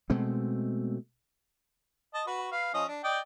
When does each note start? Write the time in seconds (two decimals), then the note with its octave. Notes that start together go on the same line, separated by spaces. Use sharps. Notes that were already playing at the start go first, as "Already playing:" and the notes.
0.10 B2 G#3 A3 C4
2.14 D#5 A5
2.27 F#4 B4 C#6
2.52 B4 F5
2.74 F3 C#4 D#5
2.88 D4
3.04 D5 D#5 G5